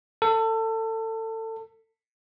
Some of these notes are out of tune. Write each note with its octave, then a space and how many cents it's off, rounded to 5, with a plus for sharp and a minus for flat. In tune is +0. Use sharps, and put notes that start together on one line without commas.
A4 +25